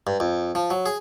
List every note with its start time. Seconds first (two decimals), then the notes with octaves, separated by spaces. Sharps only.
0.07 G2
0.20 F2
0.55 F3
0.70 F#3
0.86 G#4